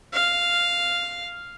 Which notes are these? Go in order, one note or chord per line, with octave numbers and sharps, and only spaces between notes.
F5